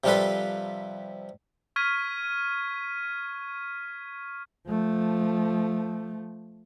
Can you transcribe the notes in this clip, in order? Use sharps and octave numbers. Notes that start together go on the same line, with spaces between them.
C3 F3 G3 F4 A4 B4
C#6 F6 G#6 B6 D#7
F3 A3